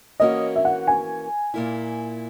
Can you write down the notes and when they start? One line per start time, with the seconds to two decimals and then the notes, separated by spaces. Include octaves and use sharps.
0.20 E3 A#3 C#4 F#4 D#5
0.56 E5
0.65 F#5
0.88 G#5
1.54 A#2 A#3 E4